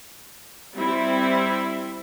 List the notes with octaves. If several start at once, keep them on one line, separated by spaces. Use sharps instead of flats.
G3 C4 E4 E5